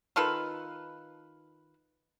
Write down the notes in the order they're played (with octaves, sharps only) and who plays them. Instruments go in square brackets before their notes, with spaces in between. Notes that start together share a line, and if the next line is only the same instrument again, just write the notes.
[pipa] D#3 F4 A4 B4